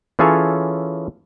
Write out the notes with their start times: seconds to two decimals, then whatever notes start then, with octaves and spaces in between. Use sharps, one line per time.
0.19 E3 C#4 F4 G#4 A4 C#5